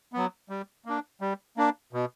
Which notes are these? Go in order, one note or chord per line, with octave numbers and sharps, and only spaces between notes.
F#3 B3
G3
A#3 D4
G3
A#3 D4
B2